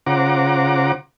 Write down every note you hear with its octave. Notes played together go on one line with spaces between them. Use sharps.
C#3 F4 C5 F#5 A#5 D6